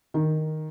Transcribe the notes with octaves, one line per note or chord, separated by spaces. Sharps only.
D#3